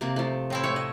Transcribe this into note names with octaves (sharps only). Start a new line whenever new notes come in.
C3 A#3 C4
F3 A3
A2 C4 E4
A3 C#5 E5
D#5